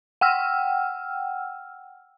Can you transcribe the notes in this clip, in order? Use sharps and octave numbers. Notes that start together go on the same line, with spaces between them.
F#5 G5 E6 F6